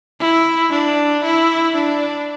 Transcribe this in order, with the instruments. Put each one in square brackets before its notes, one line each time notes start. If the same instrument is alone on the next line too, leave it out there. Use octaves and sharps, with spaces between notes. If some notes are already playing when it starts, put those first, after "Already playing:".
[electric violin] E4
D4
E4
D4